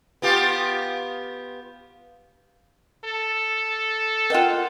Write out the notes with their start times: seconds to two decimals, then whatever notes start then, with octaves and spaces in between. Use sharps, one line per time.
0.22 B3 F4 G4
3.05 A4
4.30 F4 A#4 D#5 F#5 G5